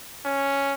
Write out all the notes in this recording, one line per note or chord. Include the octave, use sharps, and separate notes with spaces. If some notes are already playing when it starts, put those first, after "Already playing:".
C#4